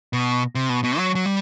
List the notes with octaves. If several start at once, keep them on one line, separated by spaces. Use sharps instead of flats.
B2
C3
B2
B2
F#3
F#3
G3